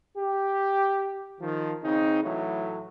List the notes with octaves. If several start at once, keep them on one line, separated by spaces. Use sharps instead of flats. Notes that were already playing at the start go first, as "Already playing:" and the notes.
G4
D#3 F3
C#3 C4 D#4
A2 E3 F#3 A3